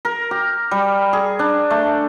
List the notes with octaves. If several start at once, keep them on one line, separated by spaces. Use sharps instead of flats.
A#4
G4
G3
G#4
D4
A3